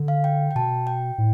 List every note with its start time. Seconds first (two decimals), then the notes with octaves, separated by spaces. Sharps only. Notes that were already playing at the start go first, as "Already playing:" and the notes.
Already playing: D3
0.08 F5
0.24 G5
0.51 G5
0.55 B2 A5
0.87 G5
1.18 A2